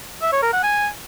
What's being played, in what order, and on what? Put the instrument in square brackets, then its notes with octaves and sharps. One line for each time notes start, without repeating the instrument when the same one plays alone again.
[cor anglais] E5
C#5
A#4
F#5
G#5